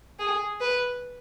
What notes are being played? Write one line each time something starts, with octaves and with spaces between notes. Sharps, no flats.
G#4
B4